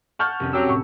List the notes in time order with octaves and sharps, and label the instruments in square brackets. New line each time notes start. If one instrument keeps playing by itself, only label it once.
[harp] F#5 A5 [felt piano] C#6 F6 G6
[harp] F1 C2 C#4
[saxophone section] F#3 G4 [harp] E6
[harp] A2 [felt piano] C#6